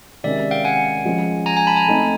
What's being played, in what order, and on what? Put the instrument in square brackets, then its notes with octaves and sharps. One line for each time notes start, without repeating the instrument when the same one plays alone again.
[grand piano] C3 D#3 G#3 C#4 [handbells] D5 E5
[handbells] F5 G5
F#5 G#5
[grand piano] F3 G#3 C#4
[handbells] G#5 A#5
G#5 A#5
A5 B5
G#5 A#5
[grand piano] A3 C4 D#4